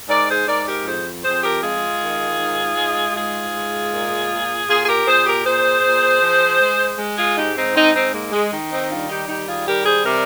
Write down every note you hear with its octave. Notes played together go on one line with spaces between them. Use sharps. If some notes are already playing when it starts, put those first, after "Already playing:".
G#2 A#4 D5
G#4 C5
G#2 A#4 D5
G4 A#4
F2 G#4 C5
F2 G#4 C5
G4 A#4
G#3 F4 G#4
D#3
G#2
G#3
G#2 F4 G#4
G#3
A#2
A#2
A#2 F4 G#4
G#4
G4 A#4
A#2 G#4 C5
G4 A#4
A#2 G#4 C5
A#2
F3
G#3
G#3
F4 G#4
G#2 D#4 G4
C4 D#4
G#2 C4 D#4
C4 D#4
G#3 A#3
G#3
D#3
C4 D#4
G3 D4 F4
D#4 G4
D#3 D#4 G4
F4 G#4
G3 G4 A#4
G#4 C5
C3 A#4 D5